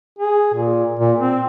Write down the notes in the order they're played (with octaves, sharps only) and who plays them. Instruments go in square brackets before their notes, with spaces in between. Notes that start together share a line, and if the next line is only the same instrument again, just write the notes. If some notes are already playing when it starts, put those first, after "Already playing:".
[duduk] G#4
A#2
A#2
C4